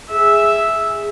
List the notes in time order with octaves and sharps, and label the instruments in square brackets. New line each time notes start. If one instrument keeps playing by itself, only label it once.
[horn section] G#4 [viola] E5